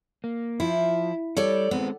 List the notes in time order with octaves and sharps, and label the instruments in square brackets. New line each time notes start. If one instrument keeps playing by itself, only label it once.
[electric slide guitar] A#3
[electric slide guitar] F3 [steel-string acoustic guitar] E4
[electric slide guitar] G3 [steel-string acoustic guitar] A4 C#5 D5
[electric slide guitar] G#3 C4 [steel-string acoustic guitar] B3